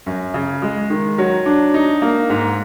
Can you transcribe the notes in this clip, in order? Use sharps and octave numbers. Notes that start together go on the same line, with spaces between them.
F#2
C#3
G#3
D#3
F#3
D4
D#4
A#3
G#2